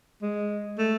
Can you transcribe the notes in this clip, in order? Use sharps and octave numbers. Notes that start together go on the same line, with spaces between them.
G#3
A3